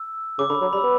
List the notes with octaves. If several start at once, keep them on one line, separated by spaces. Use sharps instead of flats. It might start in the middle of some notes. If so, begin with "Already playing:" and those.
Already playing: E6
C#3 D6
D3 B5
F#3
G3 B5
E6
B3